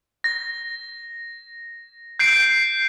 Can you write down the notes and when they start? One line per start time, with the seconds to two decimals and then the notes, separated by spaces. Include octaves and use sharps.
0.24 A#6
2.19 G6 C7 D7